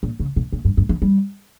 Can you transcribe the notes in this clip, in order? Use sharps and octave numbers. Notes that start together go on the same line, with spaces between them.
A#2
C#3
B2
A#2
G2
G2
E3
G3